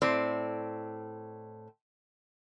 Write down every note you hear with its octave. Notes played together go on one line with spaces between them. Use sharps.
A2 C4 D5